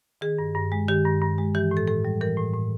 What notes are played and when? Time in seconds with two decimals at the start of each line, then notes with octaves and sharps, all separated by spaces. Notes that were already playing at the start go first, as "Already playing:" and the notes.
0.21 D#3 G#4
0.39 G2
0.55 G2
0.72 G#3
0.88 D#3 G4
1.05 G2
1.22 G2
1.38 G#3
1.55 E3 G4
1.71 A2
1.77 A4
1.88 A2 A4
2.05 G3
2.21 E3 A#4
2.37 A2
2.54 A2